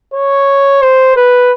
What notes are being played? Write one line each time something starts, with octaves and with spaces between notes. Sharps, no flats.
C#5
C5
B4